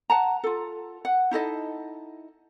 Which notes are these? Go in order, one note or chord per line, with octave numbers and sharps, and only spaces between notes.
F#5 A5 A#5
F4 A4
F#5
D#4 E4 A4 D#5